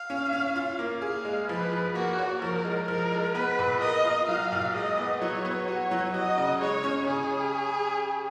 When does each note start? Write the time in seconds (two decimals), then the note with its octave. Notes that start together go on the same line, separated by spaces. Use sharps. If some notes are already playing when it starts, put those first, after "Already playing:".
Already playing: F5
0.10 C#4
0.33 C#4
0.56 F4
0.79 A#3
1.02 G#4 F5
1.25 G#3
1.48 F3 B4
1.72 F3
1.95 A#3 F#4
2.19 C#5
2.42 F3 A#4
2.65 G#3
2.88 F3 A#4
3.12 G#3
3.35 B3 B4
3.59 A#2
3.81 A#4 D#5
4.04 F4
4.28 F#3 F5
4.52 A#2
4.75 G#3 D#5
4.97 B3
5.21 F#3 C#5
5.45 B3
5.67 F#4 C#5
5.91 F#3
6.14 F#4 D#5
6.38 C#3
6.61 G#3 C#5
6.84 C#4
7.07 C#3 G#4